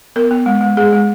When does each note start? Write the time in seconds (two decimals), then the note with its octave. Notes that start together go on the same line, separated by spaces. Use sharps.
0.16 B3 A#4
0.31 B3
0.46 G#3
0.61 G#3
0.77 G#3 G#4
0.92 G#3